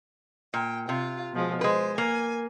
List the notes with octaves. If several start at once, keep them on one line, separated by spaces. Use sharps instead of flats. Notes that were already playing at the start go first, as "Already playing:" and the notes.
A#2 G5
C3 F4
B2 F3 G#3
G#3 B4 C5
A#3 G#5